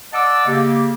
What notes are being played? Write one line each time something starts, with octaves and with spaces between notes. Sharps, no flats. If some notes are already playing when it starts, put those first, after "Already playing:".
D5 D#5 F#5 A5 D6 E6
C#3 A#3 G4